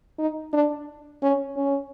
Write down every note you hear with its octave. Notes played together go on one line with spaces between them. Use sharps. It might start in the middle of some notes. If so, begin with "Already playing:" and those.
D#4
D4
C#4
C#4